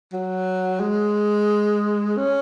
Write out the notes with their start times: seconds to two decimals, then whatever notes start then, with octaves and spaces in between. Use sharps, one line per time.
0.13 F#3
0.80 G#3
2.17 C#4